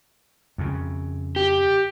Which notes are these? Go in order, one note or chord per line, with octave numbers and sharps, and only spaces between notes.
F2 C#3
G4